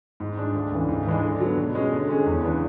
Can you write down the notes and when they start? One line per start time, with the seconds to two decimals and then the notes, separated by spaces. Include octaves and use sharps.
0.20 G#2
0.37 G#3 D4
0.55 D2
0.72 C#3 E3
0.88 G#2
1.06 E3 G#3 D4
1.23 D3
1.40 F#3 B3
1.58 B2
1.75 G#3 C#4 G#4
1.92 D3
2.09 G#3 C#4 G#4
2.26 E2
2.43 C#3 E3 B3 D4